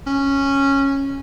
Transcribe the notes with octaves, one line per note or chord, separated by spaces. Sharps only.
C#4